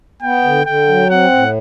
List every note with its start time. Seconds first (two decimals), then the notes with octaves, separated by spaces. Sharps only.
0.22 B3 G5
0.44 D3
0.66 D3 G5
0.88 F#3
1.10 C4 F#5
1.32 A2